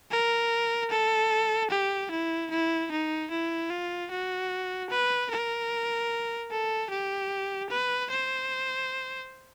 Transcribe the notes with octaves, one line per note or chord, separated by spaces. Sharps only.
A#4
A4
G4
E4
E4
D#4
E4
F4
F#4
B4
A#4
A4
G4
B4
C5